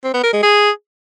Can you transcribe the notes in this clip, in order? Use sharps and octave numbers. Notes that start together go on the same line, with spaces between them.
C4
B3
A#4
G#3
G#4